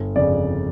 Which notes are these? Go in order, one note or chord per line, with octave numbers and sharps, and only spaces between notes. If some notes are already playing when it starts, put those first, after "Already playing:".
Already playing: G1
F2 C#3 D5